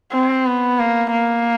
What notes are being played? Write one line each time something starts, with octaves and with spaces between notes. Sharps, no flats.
C4
B3
A#3
A#3